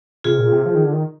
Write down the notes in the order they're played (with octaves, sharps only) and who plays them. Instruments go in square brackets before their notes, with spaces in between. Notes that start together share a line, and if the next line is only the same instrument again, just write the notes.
[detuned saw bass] C3 [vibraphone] F4 G#4
[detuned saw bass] A#2
C3
F3
D#3
D3
D#3